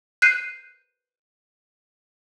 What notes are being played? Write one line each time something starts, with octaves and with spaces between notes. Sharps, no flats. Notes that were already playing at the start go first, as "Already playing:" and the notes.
F#6 G6 C7 D#7